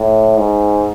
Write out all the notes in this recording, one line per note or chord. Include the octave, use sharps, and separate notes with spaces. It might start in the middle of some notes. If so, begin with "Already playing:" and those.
Already playing: A2
G#2